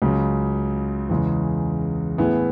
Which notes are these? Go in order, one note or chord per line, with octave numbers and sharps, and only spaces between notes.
C#2 C#3 F#3
E2 C#3 G#3
A2 E3 B3 E4 G#4